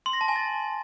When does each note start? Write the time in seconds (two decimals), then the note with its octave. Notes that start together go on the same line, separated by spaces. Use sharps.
0.06 C6
0.13 A#6
0.21 A5
0.28 G#5
0.36 A6